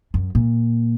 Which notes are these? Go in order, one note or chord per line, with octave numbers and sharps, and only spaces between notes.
F#2
A#2